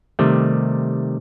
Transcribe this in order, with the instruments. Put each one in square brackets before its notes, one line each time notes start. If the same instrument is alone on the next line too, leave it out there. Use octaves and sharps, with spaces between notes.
[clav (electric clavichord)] C3 D#3 G3 A3